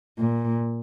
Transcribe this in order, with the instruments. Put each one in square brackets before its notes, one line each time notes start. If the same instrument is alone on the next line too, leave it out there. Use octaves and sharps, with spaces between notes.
[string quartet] A#2